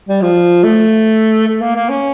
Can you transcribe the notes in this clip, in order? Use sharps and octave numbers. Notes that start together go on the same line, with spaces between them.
G3
F3
A3
A3
A#3
A#3
C#4